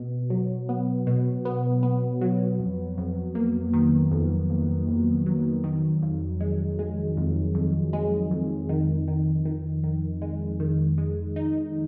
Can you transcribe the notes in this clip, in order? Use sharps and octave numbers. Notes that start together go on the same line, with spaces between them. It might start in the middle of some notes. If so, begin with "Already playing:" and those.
Already playing: B2
F#3
B3
B2
B3
B3
F#3
F2
F2
A#3
D#3
F2
F2
F2
F#3
D#3
F2
G#3
G#3
F2
F2
G#3
F2
D#3
D#3
D#3
D#3
G#3
D#3
G#3
D#4